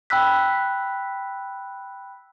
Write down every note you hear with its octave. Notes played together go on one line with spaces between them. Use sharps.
G5 B5 E6 F#6 B6